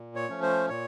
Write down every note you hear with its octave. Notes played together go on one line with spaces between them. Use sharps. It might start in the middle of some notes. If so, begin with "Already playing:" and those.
Already playing: A#2
C#5
F3 A3 C#4
C5
A#2 C#5